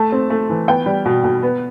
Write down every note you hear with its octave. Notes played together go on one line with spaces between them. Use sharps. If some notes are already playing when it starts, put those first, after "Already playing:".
Already playing: A3 A5
C4
A3
E3
B3 G5
G3
B2
B2
B3